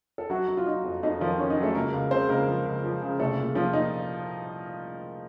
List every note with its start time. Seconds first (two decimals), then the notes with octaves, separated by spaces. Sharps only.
0.18 A4
0.30 F#3 F#4
0.48 F#3
0.57 F4
0.66 F#3 D#4
0.84 F2
1.03 F2 D#4
1.20 D#3 F3 F4
1.38 D#3 C#4
1.50 D#4
1.57 F#3
1.63 A3 A4
1.75 C#2 A#3 A#4
1.94 C#2
2.11 C#3 C4 C5
2.29 C#2 A#3 A#4
2.47 F3
2.65 C#2
2.84 F3
3.02 C#3
3.20 C2 A3 A4
3.38 A#2
3.55 A#2 F3 F4
3.73 A#2 D#4